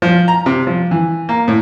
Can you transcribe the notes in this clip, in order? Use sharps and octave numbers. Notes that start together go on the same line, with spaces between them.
F3
A#5
C3
F3
E3
A#3
A2